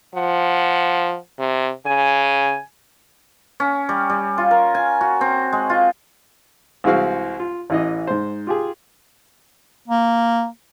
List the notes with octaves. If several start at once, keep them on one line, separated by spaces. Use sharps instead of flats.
F3 F#5
C3
C#3 G#5
C#4
G3
G3
F4
A#4
G#5
F#4
C4
G#3
F4
C2 E3 G#3 C4 F#4 F5
F4
A1 E3 D#5
G#2 C5
F4 G4 G#4
A#3